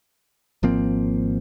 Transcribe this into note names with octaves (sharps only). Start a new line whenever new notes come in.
G#1 F3 A#3 C4